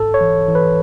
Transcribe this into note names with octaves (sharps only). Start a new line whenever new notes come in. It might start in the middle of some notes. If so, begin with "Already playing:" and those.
Already playing: G#2 A4
C#5
E3
E3
B4